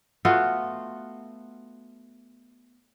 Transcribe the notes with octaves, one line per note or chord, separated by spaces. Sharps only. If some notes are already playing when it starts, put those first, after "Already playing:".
A3 B3 F4 F#4